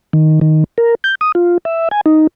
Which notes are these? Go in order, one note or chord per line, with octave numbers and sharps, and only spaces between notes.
D#3
D#3
A#4
G6
D#6
F4
E5
G#5
D#4